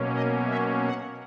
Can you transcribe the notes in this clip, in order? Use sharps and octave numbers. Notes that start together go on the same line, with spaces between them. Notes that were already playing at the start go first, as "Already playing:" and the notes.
Already playing: B2 F#3 A#3 C#4
D#5
E5
F#5